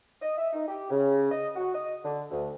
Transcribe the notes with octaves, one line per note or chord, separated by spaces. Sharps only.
D#5
E5
D#4
G4
C#3
D#5
F#4
D#5
D3
D2